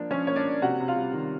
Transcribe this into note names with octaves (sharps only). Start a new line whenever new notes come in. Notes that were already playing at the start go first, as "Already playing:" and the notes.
Already playing: F3 A#3 D4
F3 C#4 C#5
A#3 C#5
D4 D5
A#3
C3 F#4 F#5
C3
F4 F5
G3
D#3